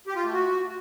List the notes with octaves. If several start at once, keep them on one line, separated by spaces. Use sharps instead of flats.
G4
F4
A3
F#4